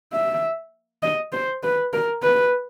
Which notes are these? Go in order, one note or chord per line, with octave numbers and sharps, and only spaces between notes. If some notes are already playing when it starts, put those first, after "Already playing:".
E5
D#5
C5
B4
A#4
B4